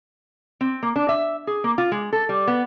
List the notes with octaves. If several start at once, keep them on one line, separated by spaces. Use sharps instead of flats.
C4
A#3
D4
E5
G#4
A#3
F4
G#3
A4
G3
B3